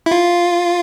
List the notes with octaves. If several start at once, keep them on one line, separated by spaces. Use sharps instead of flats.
E4
F4